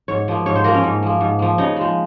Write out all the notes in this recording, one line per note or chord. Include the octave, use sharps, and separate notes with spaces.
G#2 C#5
F3 A#3
G#2 C#5
C5
F3 A#3 A#4
C#4
G#2
F3 A#3
G#2
F3 A#3
C#3 D#4
F3 G#3